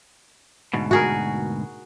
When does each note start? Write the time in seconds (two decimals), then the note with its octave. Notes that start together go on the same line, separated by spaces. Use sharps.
0.73 D2 G#2 B2
0.91 F#4 G#4 A#4